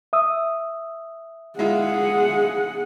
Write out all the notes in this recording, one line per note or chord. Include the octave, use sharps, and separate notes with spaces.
E5 D#6 E6
G#3 E4 F4 G#4 F#5